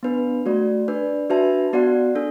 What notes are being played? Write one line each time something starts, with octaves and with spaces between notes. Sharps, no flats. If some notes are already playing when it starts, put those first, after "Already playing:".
B3 D4 B4
A3 F#4 D5
D4 B4 D5
D4 F#4 B4 E5 A5
B3 F#4 D5 F#5
D4 A4